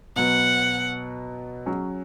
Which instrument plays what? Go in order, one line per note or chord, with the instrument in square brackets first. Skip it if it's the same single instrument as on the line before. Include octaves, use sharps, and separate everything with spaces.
[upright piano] B2 F#3 B3 [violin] F#5
[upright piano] F#3 C#4 G#4